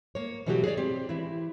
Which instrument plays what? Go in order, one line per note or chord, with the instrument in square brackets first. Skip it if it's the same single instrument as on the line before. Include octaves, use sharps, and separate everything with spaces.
[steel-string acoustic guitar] A#3 C#5
B2 E3 F#3 A3 F#4 G4
G#4 A4 B4 C#5 D5
C4 G4
E3 E4